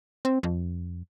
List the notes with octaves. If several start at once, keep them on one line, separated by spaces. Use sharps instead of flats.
C4
F2